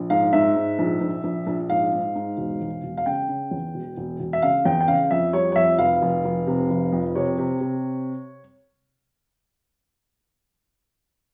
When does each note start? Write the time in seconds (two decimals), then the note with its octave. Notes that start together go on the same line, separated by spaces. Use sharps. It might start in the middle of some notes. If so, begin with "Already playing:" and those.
Already playing: A#1
0.10 G#2 F5
0.33 G#2 E5
0.56 G#2
0.79 A#1
1.01 A#1
1.24 A#1
1.47 A#1
1.69 G#2 F5
1.93 G#2
2.15 G#2
2.37 E1
2.61 E1
2.83 E1
2.97 F5
3.06 C#3 G5
3.29 C#3
3.51 E2
3.74 E1
3.97 E1
4.20 E1
4.33 E5
4.42 C#3 F5
4.65 E2 G5
4.81 G5
4.88 C#3 F5
5.11 F2 E5
5.33 G3 C#5
5.52 C#5
5.56 F2 E5
5.78 F1 F5
6.02 F1
6.25 F1
6.47 C3
6.70 F1
6.93 F2
7.15 C3 C#5
7.39 C3
7.61 C3